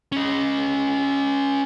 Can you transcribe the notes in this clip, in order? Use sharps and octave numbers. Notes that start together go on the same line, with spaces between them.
C#4 D#5